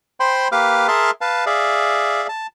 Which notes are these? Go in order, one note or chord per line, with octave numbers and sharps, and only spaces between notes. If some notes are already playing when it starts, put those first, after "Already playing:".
C5 G5 B5 C6
A#3 G4 B4 F5 D6 F6
G#4 A#4 E5 A5 C6 F6
B4 F5 A5
G#4 D5 E5 F5
A5